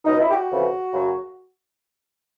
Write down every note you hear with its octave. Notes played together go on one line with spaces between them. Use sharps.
C#2 B2 F#3 D#4
E4
G4
F#4
F2 C#3 E3
F#2 C#3 F#3